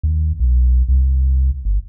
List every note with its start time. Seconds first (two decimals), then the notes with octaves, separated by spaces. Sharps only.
0.03 D#2
0.40 B1
0.89 C2
1.65 G1